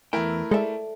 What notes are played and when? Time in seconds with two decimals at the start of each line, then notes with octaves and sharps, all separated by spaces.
0.13 E2 A3 E4 A#4 G5
0.51 G#3 A4 D5 E5